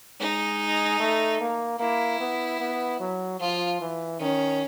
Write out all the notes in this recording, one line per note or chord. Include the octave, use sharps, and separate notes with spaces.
G#3 D#4
A3
A#3
A#3 E4
B3
B3
F#3
F3 F4
E3
D#3 C#4